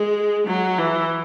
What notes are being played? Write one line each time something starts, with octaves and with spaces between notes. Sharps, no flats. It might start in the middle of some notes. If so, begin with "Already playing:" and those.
Already playing: G#3
F#3
E3